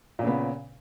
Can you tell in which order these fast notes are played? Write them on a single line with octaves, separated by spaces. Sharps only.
A#2 C#4 C#3 B3